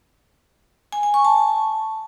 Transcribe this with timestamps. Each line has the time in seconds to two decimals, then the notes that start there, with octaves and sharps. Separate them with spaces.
0.92 G#5
1.03 G#5
1.14 C#6
1.25 A5